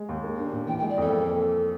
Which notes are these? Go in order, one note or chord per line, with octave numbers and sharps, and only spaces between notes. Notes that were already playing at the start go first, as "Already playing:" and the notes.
Already playing: G#3
D#2
A#3
D4
A#2
E3 G5
G5
G#3
D5
F2 A4
A#3